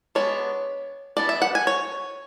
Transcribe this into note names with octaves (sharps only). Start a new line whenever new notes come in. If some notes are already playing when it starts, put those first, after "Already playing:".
G#3 B3 D4 C#5
E3 B3 D4 D5
E5
F#5
G#5
C#5